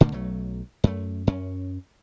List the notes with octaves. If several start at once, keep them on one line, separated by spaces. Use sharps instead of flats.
A#2 D3 A3 A#3
B1 F#3 A3
F#2 A3
F#2 C#4